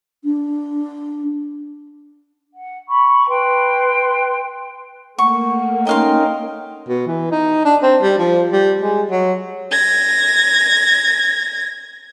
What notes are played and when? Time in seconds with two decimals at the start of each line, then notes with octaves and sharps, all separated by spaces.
0.24 D4
2.52 F#5
2.89 B5 C#6
3.27 B4 G5 C6
5.18 A3 A#3 F#5 C#6
5.87 C#4 D#4 A#4 D#5 F5 G5 C6
6.89 B2
7.07 E3
7.31 D#4
7.65 D4
7.83 C4
8.02 G3
8.18 F3
8.52 G3
8.82 G#3
9.11 F#3
9.71 G#6 A#6